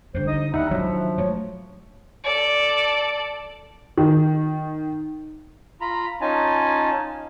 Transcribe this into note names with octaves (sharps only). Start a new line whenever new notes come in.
D3 G3 C5
D#4 D#5 D#6
D#2 G3 D#4 E5 F#5
D#3 F3 F#3 D4
A3 C#5
A4 D5
D#3
F4 A#5 B5
C#4 D#4 F4 G#5 A5